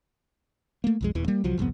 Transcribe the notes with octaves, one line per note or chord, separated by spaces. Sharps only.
A3 A#3
B1 F2 G#3
D#1 E2 E3
G3 A#3
C2 F3 F#3
G1 C2 F2 B3